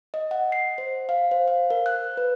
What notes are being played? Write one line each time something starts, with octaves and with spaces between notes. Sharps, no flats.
D#5
F#5
C7
C5
F5
C5
F5
A#4
F#6
B4